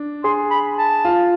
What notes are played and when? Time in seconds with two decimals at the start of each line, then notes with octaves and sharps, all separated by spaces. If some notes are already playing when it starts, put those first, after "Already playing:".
Already playing: D4
0.24 G#4 C6
0.51 B5
0.78 A5
1.05 F4